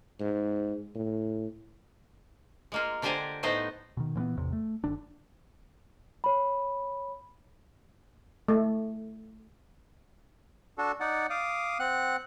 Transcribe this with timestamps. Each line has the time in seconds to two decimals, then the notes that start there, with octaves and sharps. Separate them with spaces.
0.20 G#2
0.95 A2
2.72 G#3 A#3 F4
3.02 D3 D4 G4 C5 G#5 A#5
3.43 A2 A3 B3 D#4 C5 D#5
3.97 B2 D#3
4.15 A#2 E3 A#3 B3
4.37 A1 E2 C3
4.53 A3
4.84 F#1 D3 D4
6.24 C#5 B5
8.48 A3
10.78 D4 F#4 A4
11.00 D#4 D5 F#5
11.30 F5 D6 D#6
11.80 C4 F#5 F#6